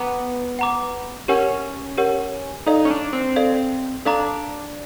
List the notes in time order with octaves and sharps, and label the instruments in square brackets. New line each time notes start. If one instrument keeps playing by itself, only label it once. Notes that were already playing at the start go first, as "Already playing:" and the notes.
Already playing: [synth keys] B3 [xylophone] F#5 A#5 D6
[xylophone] F#5 A#5 D6
[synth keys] C#4 [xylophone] G4 A#4 C#5 F#5
[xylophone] G4 A#4 C#5 F#5
[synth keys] D#4 [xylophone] A4 D5 F5
[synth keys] C#4
D4
C4
[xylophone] A4 D5 F5
[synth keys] D4 [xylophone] A4 D5 F5 A#5 D6